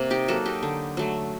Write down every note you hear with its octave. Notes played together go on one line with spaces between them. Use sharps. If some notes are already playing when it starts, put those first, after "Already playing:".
Already playing: C3 A#3
D#4 G4
F#3 A#3 F#4 A4
D#4 G4
D3
F#3 A3